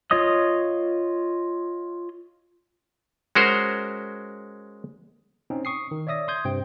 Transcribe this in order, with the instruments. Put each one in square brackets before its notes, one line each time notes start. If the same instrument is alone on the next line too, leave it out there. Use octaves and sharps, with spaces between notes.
[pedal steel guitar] F4 C#5 D#5 D#6
[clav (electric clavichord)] G#3 C#4 F#4 A#4 C5
[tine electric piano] C4 C#4 D#4
C#6 D#6 C7
D#3
C#5 D5 E5 D#6 A#6
C6 D#6 G6 G#6
G2 C3 C5 G5